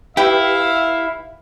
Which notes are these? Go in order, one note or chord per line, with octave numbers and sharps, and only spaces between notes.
E4 G4 B4 E5 F5 G5